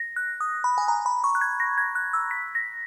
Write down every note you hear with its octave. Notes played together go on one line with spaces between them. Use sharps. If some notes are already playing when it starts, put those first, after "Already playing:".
Already playing: A#6
F#6
D#6
B5
G#5
A#5
B5
C#6
F#6
G#6
A#6
G#6
F#6
E6
B6
A#6